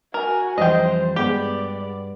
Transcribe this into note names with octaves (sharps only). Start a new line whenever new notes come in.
F#4 A#4 G#5
F2 E3 G3 C5 D#5 G5
G2 G#3 B3 G4 G#4 D5